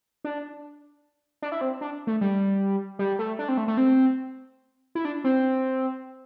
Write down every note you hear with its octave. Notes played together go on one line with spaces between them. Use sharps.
D4
D4
E4
C4
D4
A3
G3
G3
A3
D4
C4
A3
A3
C4
E4
D4
C4